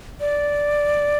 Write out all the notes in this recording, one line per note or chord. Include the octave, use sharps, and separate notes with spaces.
D5